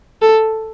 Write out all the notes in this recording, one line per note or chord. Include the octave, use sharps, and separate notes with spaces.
A4